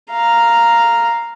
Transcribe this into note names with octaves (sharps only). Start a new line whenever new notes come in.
F5 A#5